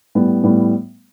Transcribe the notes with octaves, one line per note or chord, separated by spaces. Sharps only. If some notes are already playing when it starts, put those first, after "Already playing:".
A2 G3 B3
A2 G3 B3